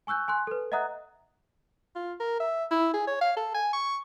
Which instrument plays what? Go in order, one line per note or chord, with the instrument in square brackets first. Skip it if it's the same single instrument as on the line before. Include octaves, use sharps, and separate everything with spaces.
[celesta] G#5 C#6 E6 F#6 G6
G#5 C6 F#6
A4 B4
D#5 E5 F#5 A#5 D#6 F#6
[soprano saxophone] F4
A#4
E5
E4
G#4
C#5
F5
A4
G#5
C#6